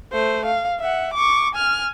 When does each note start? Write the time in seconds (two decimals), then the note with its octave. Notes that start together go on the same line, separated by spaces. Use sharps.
0.13 A3 C5
0.46 F5
0.80 E5 F#5
1.14 C#6 D6
1.55 G#5 F6